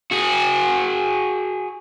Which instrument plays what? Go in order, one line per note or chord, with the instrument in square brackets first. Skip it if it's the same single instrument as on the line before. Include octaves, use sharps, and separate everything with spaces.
[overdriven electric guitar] F#4 G#4